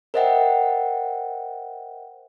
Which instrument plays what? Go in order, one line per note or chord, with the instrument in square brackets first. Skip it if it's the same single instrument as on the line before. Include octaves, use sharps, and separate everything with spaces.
[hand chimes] A#4 C5 D#5 E5 F#5 G5